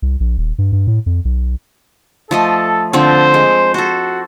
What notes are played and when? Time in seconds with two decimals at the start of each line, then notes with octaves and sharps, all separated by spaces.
0.02 C2
0.20 A#1
0.38 D#1
0.58 G2
0.72 G2
0.87 A2
1.06 F2
1.25 B1
2.31 F3 A3 A4 D#5
2.93 D3 F3 C4 C5
3.34 G#3
3.74 F#4 A4 C5